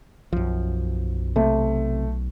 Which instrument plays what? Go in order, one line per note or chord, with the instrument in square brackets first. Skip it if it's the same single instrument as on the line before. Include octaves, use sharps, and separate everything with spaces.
[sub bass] B1 [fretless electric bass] F#2 F3
[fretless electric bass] C3 [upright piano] A3